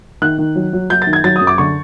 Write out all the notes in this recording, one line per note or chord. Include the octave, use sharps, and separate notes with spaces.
D#3 F#6
D#3
F#3
F#3
F#3 G6
A6
D#3
G#6
F#3 A6
D#6
F#2
D6
D3 C#6